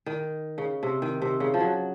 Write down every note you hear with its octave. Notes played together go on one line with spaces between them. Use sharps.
D#3
C#3
C3
D#3
C3
C#3
F3
F#3